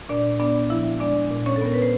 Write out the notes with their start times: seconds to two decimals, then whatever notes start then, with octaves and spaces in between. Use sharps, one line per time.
0.09 A#2 D4 D5
0.40 B3 D4 D5
0.70 F3 E4 E5
1.00 G#3 D4 D5
1.31 A#2
1.46 C#4 C#5
1.56 A4
1.61 B3 A#4
1.74 B4
1.82 C5